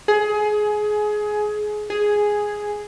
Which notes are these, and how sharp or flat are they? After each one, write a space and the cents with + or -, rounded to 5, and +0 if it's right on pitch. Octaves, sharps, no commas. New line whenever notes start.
G#4 +20
G#4 +0